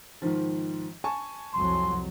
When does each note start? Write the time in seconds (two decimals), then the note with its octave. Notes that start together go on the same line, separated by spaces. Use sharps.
0.22 G#2 D#3 F3
1.04 G#5 A5 C#6
1.54 C2 F2 F#3 C6